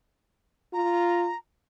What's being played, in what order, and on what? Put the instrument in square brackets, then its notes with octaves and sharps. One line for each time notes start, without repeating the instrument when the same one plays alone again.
[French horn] F4 [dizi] A#5